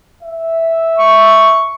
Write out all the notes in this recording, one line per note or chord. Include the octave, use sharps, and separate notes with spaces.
E5
C#6